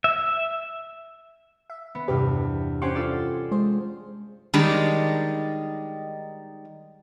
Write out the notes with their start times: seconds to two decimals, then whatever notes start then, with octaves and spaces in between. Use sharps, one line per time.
0.04 E5
1.70 E5
1.95 B3
2.08 E2 G2 C3 G4 B4
2.82 C#4 G4 C5 F#5 G#5 C6
2.95 F4 A4 D5
3.51 G#3 G#4 C5
4.54 D#3 G3 G#3 D4 D#4